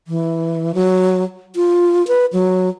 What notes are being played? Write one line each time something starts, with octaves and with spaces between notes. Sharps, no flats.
E3
F#3
F4
B4
F#3